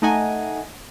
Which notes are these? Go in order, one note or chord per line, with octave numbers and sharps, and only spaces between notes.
A3 D#4 D#5 F#5 G#5